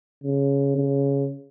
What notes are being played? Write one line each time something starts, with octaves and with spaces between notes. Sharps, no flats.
C#3
C#3